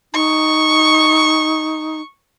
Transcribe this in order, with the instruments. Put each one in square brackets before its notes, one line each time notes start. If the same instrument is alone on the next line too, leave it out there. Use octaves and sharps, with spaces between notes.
[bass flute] D#4 [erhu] C#6